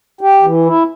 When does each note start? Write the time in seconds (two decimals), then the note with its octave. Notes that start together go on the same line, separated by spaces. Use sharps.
0.21 G4
0.43 E3
0.65 E4